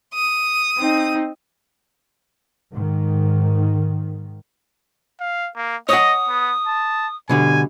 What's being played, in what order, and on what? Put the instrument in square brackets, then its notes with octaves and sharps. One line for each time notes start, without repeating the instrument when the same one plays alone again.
[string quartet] D#6
[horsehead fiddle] C4 D#4
[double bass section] G#2 D#3
[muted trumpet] F5
A#3
[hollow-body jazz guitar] C#5 F#5 [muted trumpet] D#5 [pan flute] D#6
[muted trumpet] B3
A5
[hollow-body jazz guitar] B2 D3 G3 [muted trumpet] G#5